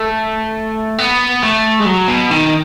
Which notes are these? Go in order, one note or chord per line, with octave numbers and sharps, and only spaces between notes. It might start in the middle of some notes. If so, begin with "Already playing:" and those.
Already playing: A3
B3
A3
G#3
F#3
B2
D#3